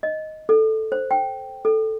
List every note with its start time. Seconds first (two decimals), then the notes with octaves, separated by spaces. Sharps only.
0.03 D#5
0.49 A4
0.92 C5
1.11 G5
1.65 A4